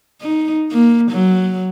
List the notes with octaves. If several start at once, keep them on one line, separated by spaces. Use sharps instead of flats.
D#4
A#3
F#3